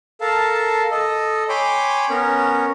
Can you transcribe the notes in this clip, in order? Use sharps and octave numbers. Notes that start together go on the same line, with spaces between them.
A4 A#4 F5 A5
A4 D#5
C#5 G5 G#5 B5 C6 D6
B3 C#4 A#4 C#5